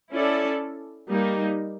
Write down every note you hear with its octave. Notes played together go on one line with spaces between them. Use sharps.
C#4 E4 A4 D5
G3 A#3 D#4